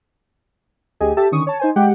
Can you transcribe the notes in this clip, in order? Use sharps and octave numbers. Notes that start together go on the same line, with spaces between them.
D2 G4 G#4 D#5 G#5
G4 A4 E5 A5
D3 D#3 C#4 C#6 D#6
C#5 A5
D#4 C5 G#5
G#3 G4 F#5 G5